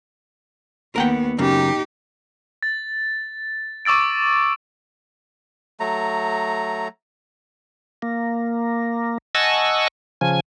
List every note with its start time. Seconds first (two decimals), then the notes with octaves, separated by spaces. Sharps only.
0.96 D#2 B3 A#4 F#5 G5
1.39 F#2 C#3 D#4 G4
2.63 A6
3.85 C#6 D6 E6 A6 D7
5.80 F#3 A3 A#5
8.02 A#3
9.35 D#5 F#5 G#5 A5 C#6 E6
10.21 C#3 F3 G#5